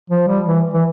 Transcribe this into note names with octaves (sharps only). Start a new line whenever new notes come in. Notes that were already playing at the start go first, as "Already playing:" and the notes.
F3
G3
E3
E3